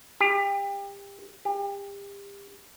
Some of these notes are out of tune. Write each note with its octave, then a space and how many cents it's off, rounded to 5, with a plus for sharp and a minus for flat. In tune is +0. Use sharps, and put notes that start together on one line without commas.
G4 +30
G4 +35